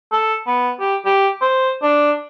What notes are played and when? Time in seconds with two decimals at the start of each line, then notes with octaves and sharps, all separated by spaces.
0.12 A4
0.47 B3
0.80 G4
1.06 G4
1.42 C5
1.83 D4